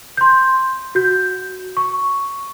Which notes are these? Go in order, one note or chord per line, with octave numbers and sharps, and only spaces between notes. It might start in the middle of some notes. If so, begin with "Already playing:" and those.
C6 G6
F#4 G6
C#6